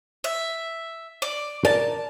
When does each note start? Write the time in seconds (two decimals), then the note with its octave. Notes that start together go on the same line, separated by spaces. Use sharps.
0.24 E5
1.22 D5
1.65 A#4 D5 A5